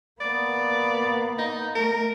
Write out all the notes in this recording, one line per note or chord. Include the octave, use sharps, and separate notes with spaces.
A#3 B3 D5
D#4
A3 A#4